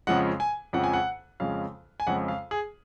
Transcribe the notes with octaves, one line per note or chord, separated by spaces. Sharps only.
F2 C#3 F3 G#3 F#5
G#5
F2 C#3 F3 G#3 F#5
G#5
F#5
F2 C#3 F3 G#3 F5
G#5
F2 C#3 F3 G#3 F#5
F5
G#4